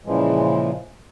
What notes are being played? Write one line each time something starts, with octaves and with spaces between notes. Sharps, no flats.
A#2 C#3 E3 F3 G#3